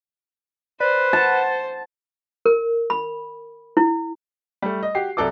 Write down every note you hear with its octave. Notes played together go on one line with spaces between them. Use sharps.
B4 C5 D5
F#5 A5
A#4
B5
E4
G3 A3
D#5
F#4 G4 C7
C2 F#3 A4 D5 D6